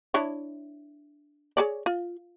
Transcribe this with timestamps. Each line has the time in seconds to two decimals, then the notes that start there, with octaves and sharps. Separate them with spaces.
0.14 D4 E4 C#5
1.57 G#4 C#5 D5
1.86 F4